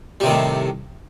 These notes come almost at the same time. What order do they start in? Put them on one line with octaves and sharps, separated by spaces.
G3 C3 D#3 A2